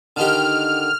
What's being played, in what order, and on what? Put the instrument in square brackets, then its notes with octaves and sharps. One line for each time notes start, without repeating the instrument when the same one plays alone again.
[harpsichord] D3 D#3 G4 [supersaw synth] F6